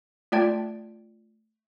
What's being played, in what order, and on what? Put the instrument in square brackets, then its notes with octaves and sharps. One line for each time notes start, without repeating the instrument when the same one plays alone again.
[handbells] A3 F4 D5 G5 A5 G#6